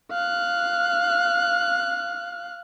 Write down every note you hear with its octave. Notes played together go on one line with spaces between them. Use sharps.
F5 F#6